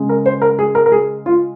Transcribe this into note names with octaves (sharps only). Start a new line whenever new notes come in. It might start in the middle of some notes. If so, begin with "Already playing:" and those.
Already playing: C#3 G#3
A#4
C5
A#4
G#4
A#4
A#4
G#4
F4